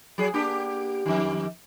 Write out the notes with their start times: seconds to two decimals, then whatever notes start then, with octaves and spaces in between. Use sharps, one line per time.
0.18 F#3 G#4
0.34 A#3 D4 G4
1.06 F2 D#3